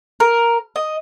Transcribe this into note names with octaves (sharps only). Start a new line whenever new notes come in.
A#4
D#5